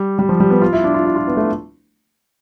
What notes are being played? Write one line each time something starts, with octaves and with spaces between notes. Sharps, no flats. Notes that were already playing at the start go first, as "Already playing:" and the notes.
Already playing: G3
G3
F3
G3
B3
F4
E4
D4
F4
E4
F4
B3
A3